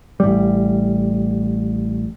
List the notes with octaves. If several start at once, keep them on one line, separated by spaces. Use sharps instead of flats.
A1 G3